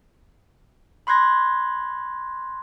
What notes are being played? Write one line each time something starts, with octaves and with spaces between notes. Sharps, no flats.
B5 C6 F#6 G#6 A#6